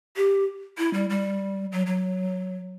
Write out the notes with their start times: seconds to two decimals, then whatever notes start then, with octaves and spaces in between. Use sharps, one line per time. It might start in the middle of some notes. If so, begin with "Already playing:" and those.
0.16 G4
0.78 E4
0.94 G3
1.10 G3
1.72 F#3
1.87 F#3